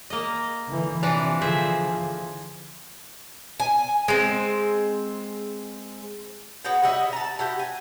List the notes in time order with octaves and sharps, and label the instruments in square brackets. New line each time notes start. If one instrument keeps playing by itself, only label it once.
[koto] A#3 D#5
[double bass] D3 E3
[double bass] C3 [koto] E3 F3 D4
[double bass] D3 F3 [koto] G#4 C5 E5
[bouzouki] G#5
G#3 C4
B3 F#4 G#4 G5
G3 F#4 D#5 E5
A5 A#5
E4 F#4 G4
G#5